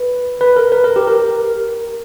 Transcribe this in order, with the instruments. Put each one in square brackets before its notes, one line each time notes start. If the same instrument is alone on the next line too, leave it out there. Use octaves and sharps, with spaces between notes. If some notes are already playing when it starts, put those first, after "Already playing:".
Already playing: [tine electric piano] B4
B4
A#4
B4
A#4
G4
A#4